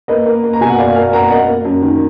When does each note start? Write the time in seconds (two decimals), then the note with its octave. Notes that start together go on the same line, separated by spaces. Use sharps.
0.08 A#3 B4 D#5
0.26 A#3
0.43 A#3
0.53 A#5
0.61 B2 G#5
0.70 F#5
0.78 A#3 D5 F5
0.95 A#3 F5 G#5
1.13 A#3 F#5 A#5
1.30 A#3 D#5 F#5
1.48 A#3
1.65 F#2
1.82 D#3